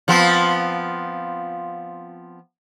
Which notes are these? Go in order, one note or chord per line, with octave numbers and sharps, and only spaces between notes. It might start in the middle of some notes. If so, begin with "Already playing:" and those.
F3 B3 C4